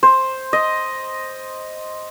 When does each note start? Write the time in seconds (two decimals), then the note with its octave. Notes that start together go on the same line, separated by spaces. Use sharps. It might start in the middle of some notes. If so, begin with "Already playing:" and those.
0.03 C5
0.53 D#5